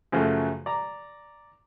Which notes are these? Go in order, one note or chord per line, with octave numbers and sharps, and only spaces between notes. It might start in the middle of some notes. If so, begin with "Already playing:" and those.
F#2 C#3 F3 F#3 A3
D5 A#5